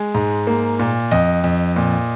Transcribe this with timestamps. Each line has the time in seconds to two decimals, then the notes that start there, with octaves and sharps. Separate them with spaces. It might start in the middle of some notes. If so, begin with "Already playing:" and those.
Already playing: G#3 G#5
0.15 G#2
0.47 A#3
0.79 A#2
1.11 F2 D#5
1.44 F2
1.76 A#2